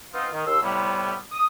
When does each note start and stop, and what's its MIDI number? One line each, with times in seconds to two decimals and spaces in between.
0.13 0.27 59
0.13 0.27 60
0.13 0.27 63
0.13 0.27 65
0.32 0.42 51
0.46 0.60 39
0.46 0.60 84
0.46 0.60 88
0.62 1.15 45
0.62 1.15 48
0.62 1.15 55
0.62 1.15 59
1.31 1.46 87